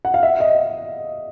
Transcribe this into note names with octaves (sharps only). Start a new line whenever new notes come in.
F#5
F5
E5
D#5